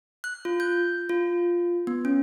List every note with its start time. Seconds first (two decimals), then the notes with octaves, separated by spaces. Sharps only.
0.24 F#6
0.45 F4
0.60 G6
1.09 F4
1.87 B3
2.05 C#4